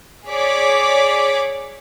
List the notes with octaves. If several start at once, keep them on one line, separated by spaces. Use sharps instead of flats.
G#4 C#5 D5 D6 B6